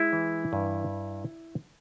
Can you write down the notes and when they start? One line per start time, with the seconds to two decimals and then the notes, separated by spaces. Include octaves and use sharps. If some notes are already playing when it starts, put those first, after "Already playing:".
Already playing: G#3 E4
0.13 E3
0.53 G2